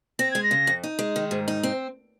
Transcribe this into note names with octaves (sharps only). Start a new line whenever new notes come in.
C4 A#6
G#3 G#6
A#6
C#3
F2
D#4
G#3
D#3
G#2
D#4
C4